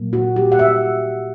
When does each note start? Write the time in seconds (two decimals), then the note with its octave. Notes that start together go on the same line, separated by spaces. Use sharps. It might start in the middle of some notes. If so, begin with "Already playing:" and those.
Already playing: A#2 F#3 A#3
0.13 F#4
0.36 G4
0.52 F#5
0.59 E5